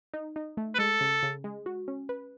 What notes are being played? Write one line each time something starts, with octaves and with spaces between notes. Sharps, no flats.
D#4
D#4
A3
B4
G#3 A4
C#3
C#3
G#3
F#4
C#4
B4